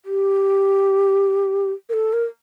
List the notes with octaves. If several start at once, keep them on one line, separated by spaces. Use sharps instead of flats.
G4
A#4
A4
A#4